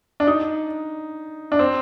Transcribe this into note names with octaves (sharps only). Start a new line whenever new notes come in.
D4
D#4
D4
C4